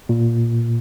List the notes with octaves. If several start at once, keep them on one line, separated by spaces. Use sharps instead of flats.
A#2